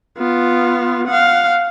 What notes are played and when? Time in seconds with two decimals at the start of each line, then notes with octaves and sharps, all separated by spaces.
0.18 B3 F4
1.07 F5 F#5